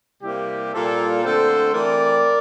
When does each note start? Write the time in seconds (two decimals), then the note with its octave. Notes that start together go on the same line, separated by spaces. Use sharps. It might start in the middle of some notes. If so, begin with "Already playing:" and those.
0.22 C3 G3 A#3 E4 G4
0.73 A#2 G3 A#3 F4 A4
1.23 D3 A3 C4 A4 C5
1.73 E3 A3 C4 A#4 D5